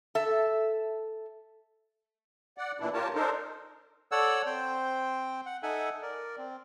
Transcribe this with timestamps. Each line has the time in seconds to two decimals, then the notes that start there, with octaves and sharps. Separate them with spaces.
0.15 A4 E5
2.58 D5 F#5
2.80 A#2 E3 D4 E4
2.93 F4 G4 A#4 C#5 A5
3.15 D4 D#4 A4 A#4 C5
4.12 A4 C#5 D5 F#5 E6
4.46 C4 C5 G5
5.46 F#5
5.63 D#4 A4 E5 F#5 G#5
6.02 A#4 D5
6.38 C4